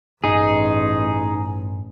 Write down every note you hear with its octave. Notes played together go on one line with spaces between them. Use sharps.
A1 G2 D#4 G#4